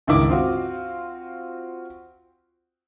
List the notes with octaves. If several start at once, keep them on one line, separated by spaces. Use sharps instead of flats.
G1 C#2 D#3 E4 D6
C4 F4 F#4